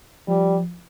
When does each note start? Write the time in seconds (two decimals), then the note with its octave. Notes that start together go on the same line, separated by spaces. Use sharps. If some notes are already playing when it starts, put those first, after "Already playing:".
0.28 F3 G3